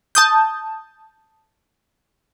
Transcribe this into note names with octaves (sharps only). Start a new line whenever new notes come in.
A5 D#6 G6